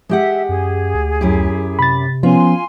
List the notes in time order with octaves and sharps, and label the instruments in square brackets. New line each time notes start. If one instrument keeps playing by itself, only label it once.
[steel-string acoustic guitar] G#3 G4 F#5 [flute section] E5
[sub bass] F#2 [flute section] G#4
[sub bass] D2
[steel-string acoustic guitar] F#2 E4 G4
[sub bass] C3 [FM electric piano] B5 A6
[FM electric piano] F3 B3 C#4 [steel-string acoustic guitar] F4 [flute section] G#5 C6